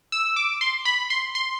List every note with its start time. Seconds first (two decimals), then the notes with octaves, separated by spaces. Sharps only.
0.12 E6
0.36 D6
0.61 C6
0.85 B5
1.10 C6
1.35 C6